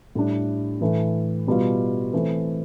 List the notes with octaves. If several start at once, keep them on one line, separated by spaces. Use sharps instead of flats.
A2 G3 D4
A2 E3 A3
B2 G3 B3 F4
E3 A3 C4